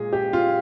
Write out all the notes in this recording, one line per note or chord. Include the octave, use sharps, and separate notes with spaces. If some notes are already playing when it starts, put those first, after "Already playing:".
Already playing: A#2 G#3 G#4
G4
F4